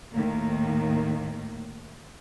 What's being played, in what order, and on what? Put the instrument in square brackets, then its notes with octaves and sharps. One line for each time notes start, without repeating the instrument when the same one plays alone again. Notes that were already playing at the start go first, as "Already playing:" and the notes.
[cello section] D#2 A2 D#3 A#3